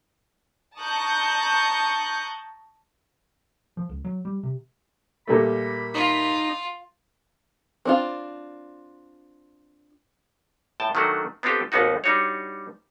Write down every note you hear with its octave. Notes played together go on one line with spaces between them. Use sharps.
A5 A#5 C#6 D#6 F#6 G6
F3
C#2
F#3
G3
C3
A#2 G3 A3 B5
D#4 F4
C4 D4 F4
A2 G5 A5
D#3 F#3 A3 D4 F#4
B3 C4 D4 F4 G4 A4
G#1 D#2 B3 D#4 F#4
G3 D4 D#4 F#4 C#5